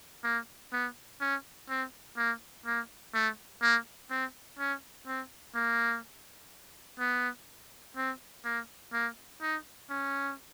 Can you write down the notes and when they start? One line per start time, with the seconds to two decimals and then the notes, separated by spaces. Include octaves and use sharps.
0.24 A#3
0.73 B3
1.21 C#4
1.69 C4
2.17 A#3
2.66 A#3
3.14 A3
3.62 A#3
4.10 C4
4.59 C#4
5.07 C4
5.55 A#3
7.00 B3
7.97 C4
8.45 A#3
8.93 A#3
9.42 D#4
9.90 C#4